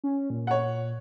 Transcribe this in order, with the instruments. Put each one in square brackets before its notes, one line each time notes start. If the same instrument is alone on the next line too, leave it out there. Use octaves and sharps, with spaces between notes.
[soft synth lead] C#4
A#2
[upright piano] C#5 F#5